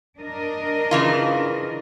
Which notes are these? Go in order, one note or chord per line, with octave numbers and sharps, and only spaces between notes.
D4 A#4 D#5
C#3 E3 F4